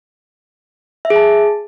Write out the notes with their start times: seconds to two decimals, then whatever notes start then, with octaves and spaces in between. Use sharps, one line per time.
1.05 E5
1.10 G#4
1.16 A5